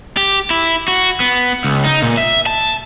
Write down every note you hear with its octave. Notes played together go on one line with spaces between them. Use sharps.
G4
E4
F#4
B3
C#2
D#4
A#2
E5
A5